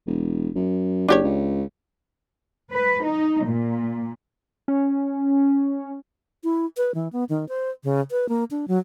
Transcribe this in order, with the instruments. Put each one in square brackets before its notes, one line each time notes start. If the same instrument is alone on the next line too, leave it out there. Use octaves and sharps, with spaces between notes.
[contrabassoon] E1
F#2
[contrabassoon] F#1 [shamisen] D4 G4 C#5
[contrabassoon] C#2
[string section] B4
D#4
A#2
[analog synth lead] C#4
[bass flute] E4
B4
E3
B3
D#3
C5
C#3
B4
A#3
D4
F#3